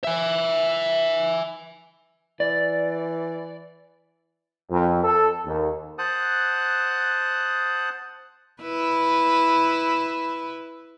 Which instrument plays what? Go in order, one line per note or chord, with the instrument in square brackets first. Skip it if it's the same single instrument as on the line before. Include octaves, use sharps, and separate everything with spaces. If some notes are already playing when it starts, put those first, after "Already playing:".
[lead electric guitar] E5 G#5
[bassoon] E3 [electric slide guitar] D5
[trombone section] F2
A4
D#2
[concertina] C5 F#5 A5 D#6 F#6
[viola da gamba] E4 B4